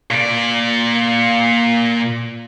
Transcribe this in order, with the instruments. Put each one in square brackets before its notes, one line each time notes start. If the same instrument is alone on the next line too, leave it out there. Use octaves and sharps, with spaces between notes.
[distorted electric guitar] A#2 D5